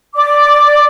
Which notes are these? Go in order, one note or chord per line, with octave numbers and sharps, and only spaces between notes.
D5 D6